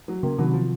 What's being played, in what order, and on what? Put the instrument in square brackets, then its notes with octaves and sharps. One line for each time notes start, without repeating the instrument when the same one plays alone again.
[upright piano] F#3
[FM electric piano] C#3 [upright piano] A#3
[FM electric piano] C3 D#3 [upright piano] F#3
[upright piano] F3